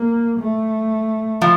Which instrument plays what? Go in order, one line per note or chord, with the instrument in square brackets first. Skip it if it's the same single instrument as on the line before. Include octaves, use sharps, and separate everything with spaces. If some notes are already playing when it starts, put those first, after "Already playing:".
Already playing: [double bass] A#3
A3
[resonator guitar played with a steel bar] F3